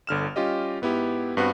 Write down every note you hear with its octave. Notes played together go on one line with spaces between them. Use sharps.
G1 D3 F6 E7
G3 C#4 F4 G4 D#5
G#2 B3 E4 G4
G2 B3 C4 F#4 F#6